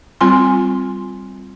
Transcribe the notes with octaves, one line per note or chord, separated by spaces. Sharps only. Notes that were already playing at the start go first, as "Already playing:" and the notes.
G3 C4 F4 G#5 C6